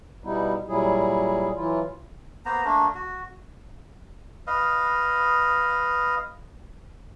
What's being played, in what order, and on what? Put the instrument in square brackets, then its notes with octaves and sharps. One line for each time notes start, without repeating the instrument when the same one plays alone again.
[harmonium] B2 G3 B3 D#4 E4
A#2 F#3 G3 E4 G#4
E3 F#3 E4 F4
[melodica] A#3 B3 C5 A#5
A3 A#3 D4
F#4
B4 D#5 F5